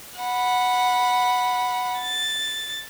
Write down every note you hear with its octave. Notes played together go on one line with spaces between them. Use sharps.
F#5 B5
A6